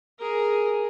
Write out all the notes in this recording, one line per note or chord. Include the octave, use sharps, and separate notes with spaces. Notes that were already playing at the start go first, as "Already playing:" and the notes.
G#4 A#4